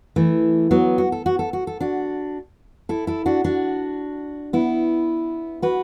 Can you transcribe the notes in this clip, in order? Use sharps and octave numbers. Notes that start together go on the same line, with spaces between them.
E3 A3
F#3 B3
F#4
A4
F#4
A4
F#4
A4
D4 F#4
E4 A4
E4 A4
D4 F#4
D4 F#4
B3 E4
F#4 B4